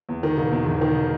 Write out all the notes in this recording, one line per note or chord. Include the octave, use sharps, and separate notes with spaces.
E2
D#3
E1
E2
E1
D#3